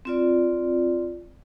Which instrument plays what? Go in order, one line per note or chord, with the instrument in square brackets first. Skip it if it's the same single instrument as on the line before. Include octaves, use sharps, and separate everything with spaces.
[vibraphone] C4 F4 D5